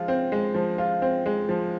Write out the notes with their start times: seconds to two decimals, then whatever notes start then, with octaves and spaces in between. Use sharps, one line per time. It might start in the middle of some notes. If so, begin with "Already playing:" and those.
Already playing: F3 G#3 F4
0.08 C4
0.32 G#3
0.54 F3
0.78 F4
1.02 C4
1.26 G#3
1.49 F3